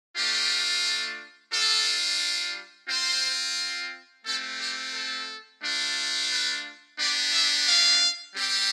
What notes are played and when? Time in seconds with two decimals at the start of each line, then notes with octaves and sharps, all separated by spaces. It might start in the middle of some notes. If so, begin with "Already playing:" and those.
0.15 A3 D4 F4 G4
1.52 G3 D4 F4 A4
2.89 C4 F4 C5
4.25 A3 C4 F4 A4
4.60 G4
4.94 A4
5.62 A3 D4 F4
6.31 B4
6.98 B3 D4 G4 D5
7.33 E5
7.67 F5
8.35 G3 C4 G4